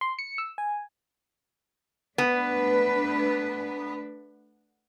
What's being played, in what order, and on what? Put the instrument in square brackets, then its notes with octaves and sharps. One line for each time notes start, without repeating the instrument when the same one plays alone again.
[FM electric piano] C6
C#7
E6
G#5
[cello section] A3 D4 B4 [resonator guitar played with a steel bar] B3